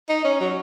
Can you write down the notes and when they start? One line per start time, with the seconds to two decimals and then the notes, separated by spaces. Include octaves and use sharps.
0.09 D#4
0.25 C#4
0.40 F#3